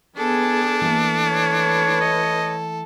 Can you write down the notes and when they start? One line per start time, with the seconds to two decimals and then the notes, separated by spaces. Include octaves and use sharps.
0.17 B3 D4 G#4 A4
0.81 E3 A3 A#3
1.26 B4 C#5
2.01 D#5